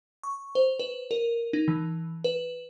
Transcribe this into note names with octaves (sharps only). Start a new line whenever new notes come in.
C#6
C5
B4
A#4
D#4
E3
B4